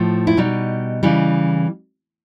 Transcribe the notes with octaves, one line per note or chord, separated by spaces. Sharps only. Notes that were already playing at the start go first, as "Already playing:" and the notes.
Already playing: A2 F3
E4
B2 G3 D#4
C#3 E3 G3